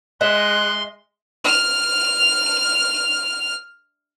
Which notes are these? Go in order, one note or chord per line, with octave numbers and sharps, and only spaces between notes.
G#3 D#5 E5 C6 F#6
F6 F7